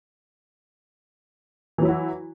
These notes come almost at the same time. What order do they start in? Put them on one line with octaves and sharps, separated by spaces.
E3 F#3 E4 F#4